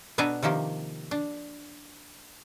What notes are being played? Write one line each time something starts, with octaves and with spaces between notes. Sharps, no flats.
B2 B3 D4 A4 G#5 A#5
C3 D#3 F3 A#3 G4
D4